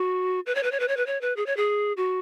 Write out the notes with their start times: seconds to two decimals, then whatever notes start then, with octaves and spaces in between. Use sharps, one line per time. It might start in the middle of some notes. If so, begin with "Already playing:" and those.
Already playing: F#4
0.46 B4
0.55 C#5
0.63 B4
0.71 C#5
0.80 B4
0.88 C#5
0.97 B4
1.06 C#5
1.21 B4
1.36 G#4
1.46 C#5
1.57 G#4
1.97 F#4